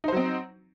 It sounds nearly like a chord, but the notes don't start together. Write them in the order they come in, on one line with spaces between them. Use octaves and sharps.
D#4 C5 F#3 C4